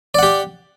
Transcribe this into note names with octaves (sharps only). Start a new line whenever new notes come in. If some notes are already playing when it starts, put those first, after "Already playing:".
G4 D5 F#5